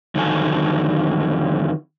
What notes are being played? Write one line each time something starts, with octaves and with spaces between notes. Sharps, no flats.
F2 D3 D#3 F#3 A4 G#5